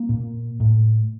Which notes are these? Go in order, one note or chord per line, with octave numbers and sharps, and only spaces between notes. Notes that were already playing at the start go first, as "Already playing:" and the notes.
Already playing: A#3
A#2
A2